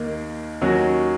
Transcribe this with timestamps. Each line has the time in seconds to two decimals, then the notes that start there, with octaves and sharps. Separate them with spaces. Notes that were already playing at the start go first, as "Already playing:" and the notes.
Already playing: D#2 D#3 A#3
0.61 D#2 D#3 F#3 C#4 F#4